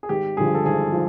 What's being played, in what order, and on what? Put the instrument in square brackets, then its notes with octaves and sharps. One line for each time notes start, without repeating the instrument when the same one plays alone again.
[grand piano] G#4
G#1 G4
G2 D3 F3 G#4
A4
G#1 G#4
F3